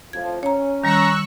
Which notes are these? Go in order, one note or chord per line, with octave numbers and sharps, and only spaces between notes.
F2 A2 F3 G#6
C#4 C#5 A#5
D#3 G3 A#5 C#6 E6 F#6